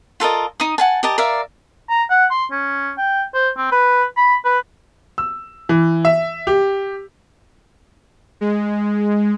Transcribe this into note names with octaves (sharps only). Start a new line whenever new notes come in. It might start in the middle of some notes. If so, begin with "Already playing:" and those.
F4 A4 A#4 D#5
D#4 D#5 D#6
F#5 G#5 A5
G4 A#4 D#5 A5
A#4 D5 E5 F5
A#5
F#5
C6
C#4
G5
C5
C4
B4
B5
B4
E6
E3
E5
G4
G#3